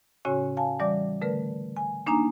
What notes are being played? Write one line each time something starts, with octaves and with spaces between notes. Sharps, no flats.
A2 C#3 C#4 F#4 C#5 G#5
F5 G#5 A5
E3 G3 D5 D6
D3 A3 A#4 B4
G#5
A#3 D4 D#4 G#5 A#5